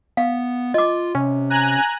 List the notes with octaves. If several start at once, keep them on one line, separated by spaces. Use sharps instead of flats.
B3 F5
F4 D#5 D6
C3 C#4
G#5 A#5 F#6